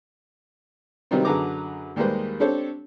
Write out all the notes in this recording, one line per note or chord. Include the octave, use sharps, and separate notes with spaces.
C3 D#3 F#3 G3 B3 C4
F#2 D3 G#4 B4 A#5 D6
D#2 G3 G#3 A#3 B4 C5
C4 D4 G4 A4 C5 C#5